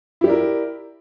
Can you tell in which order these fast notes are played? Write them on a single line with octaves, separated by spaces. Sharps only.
E4 G4 D5 A#4